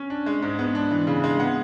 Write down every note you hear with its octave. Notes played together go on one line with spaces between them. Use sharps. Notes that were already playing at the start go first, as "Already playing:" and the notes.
Already playing: C#4
D4
G#3
G#2
B3
D4
E3
C#3
G#3
B3 F#5